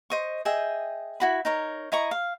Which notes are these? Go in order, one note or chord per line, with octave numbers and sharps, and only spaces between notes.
C5 D#5 C#6
G#4 D#5 E5 G5
E4 F#4 B5
D#4 A#4 C#5
E4 D#5 A#5 C#6
F5